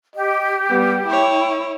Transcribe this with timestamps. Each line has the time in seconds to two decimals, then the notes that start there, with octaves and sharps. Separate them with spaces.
0.15 G4 D#5
0.70 G3 B3
1.07 E4 C#5 G5